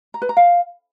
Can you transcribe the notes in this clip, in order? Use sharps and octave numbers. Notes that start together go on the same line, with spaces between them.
A#5
B4
A#5
F5